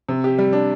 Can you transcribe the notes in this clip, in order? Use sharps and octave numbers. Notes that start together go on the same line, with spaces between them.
C3
G4
G3
D4